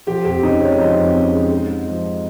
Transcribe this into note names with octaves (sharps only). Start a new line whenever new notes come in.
F3 G4
F2 G4
C#3 D#4
G#3 C#4
F3 D#4
F2
C#3
G#3
G#3
G#2
F3